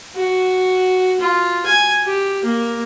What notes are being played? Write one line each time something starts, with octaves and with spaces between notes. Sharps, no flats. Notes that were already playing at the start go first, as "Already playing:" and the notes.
F#4
F4
G#5
G4
A#3